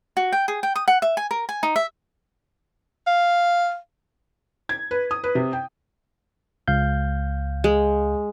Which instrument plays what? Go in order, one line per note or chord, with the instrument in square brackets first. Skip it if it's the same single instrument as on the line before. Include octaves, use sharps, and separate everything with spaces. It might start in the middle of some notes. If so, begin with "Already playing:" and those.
[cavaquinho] F#4
G5
G#4
G5
D#6
F#5
E5
G#5
A#4
G#5
D#4
E5
[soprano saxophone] F5
[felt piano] G#6
B4
D#6
B4
C3
G5
[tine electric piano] C#2 F5 G6
[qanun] G#3